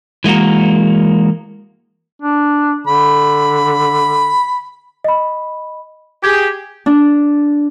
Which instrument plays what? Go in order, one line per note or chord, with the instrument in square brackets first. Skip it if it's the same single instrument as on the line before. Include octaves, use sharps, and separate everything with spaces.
[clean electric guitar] E3 G#3 A#3 F#4 A#4
[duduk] D4
[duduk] D3 [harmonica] B5
[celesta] D#5 B5
[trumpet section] G4 G#4 [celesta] G#6
[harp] D4